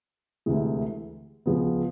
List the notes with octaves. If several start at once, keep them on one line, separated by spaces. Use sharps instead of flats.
D2 C3 E3 G#3
C#2 C#3 F3 G#3 B3